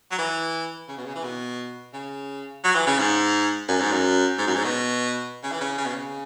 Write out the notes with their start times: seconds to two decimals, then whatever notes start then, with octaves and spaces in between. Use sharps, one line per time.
0.11 F#3
0.19 E3
0.89 C#3
0.97 B2
1.05 C#3
1.15 E3
1.24 B2
1.93 C#3
2.64 F#3
2.75 E3
2.87 C#3
2.98 G#2
3.68 F#2
3.80 G#2
3.92 F#2
4.38 G#2
4.47 F#2
4.56 G#2
4.64 B2
5.43 C#3
5.52 E3
5.61 C#3
5.78 C#3
5.86 B2
5.94 C#3